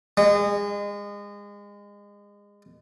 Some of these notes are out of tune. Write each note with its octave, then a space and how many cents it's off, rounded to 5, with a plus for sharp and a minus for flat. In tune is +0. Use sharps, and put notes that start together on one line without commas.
G#3 -30